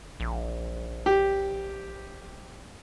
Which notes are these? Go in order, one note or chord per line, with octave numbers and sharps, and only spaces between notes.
A#1
G4